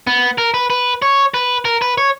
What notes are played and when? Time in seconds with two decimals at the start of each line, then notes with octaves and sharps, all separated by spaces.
0.07 B3
0.38 A#4
0.54 B4
0.70 B4
1.02 C#5
1.34 B4
1.65 A#4
1.82 B4
1.98 C#5